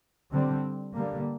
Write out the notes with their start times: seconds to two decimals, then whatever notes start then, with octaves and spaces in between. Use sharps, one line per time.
0.32 D3 G3 C4
0.94 D3 G3 A#3